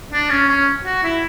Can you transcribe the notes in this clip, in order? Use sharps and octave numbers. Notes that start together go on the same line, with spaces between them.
D4
C#4
C#4
F#4
E4